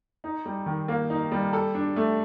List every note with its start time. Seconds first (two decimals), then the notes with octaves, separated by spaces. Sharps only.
0.24 D#4
0.45 G3
0.66 D#3
0.88 A#3
1.10 D#4
1.31 G3
1.53 A4
1.74 D4
1.96 A3